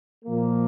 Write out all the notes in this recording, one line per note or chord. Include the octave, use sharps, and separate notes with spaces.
A#2 F3 A#3